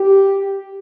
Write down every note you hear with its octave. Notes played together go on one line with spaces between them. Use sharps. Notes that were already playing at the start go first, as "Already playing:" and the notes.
Already playing: G4